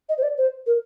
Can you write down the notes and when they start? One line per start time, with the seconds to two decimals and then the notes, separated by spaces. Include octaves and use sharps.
0.09 D#5
0.18 C5
0.23 D5
0.38 C5
0.67 A#4